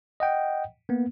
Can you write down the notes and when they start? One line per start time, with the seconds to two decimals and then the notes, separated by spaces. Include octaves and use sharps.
0.20 D#5 F#5 G5
0.89 A#3 B3